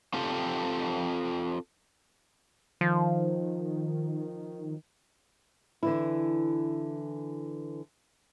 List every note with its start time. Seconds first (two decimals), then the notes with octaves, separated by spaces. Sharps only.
0.14 C4 F4 G4 A4
2.81 D#3 F3
5.83 D3 E3 E4